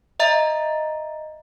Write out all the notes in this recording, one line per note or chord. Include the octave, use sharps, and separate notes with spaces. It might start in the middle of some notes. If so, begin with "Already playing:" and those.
D#5 E5 A#5 A6